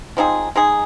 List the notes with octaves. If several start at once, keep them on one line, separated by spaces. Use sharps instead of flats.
F3 C4 D#4 G#4
G#3 D#4 G#4